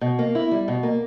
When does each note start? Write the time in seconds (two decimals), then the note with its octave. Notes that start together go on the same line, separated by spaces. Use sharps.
0.01 B2
0.19 A#3
0.35 E4
0.51 G3
0.68 B2
0.83 A#3